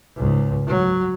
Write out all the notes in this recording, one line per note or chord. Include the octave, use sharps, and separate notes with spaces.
C#2 G#2
F#3